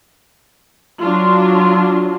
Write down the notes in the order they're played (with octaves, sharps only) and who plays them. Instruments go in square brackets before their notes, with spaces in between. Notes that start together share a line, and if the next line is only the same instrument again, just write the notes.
[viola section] F#3 D4 F4